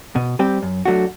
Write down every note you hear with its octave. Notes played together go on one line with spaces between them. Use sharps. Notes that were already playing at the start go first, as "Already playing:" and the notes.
B2
G3 C4 G4
F#2
F#3 A3 D4 F#4